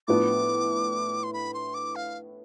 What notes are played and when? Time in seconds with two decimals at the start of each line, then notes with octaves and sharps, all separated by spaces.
0.07 A2 F3 B3 D4 D6
1.23 C6
1.33 B5
1.54 C6
1.74 D6
1.96 F5